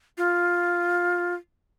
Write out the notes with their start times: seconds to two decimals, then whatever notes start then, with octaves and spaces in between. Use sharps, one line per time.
0.18 F4